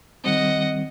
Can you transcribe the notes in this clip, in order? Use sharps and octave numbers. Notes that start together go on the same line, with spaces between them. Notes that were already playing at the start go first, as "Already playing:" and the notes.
D#3 G3 C4 D#5 F#5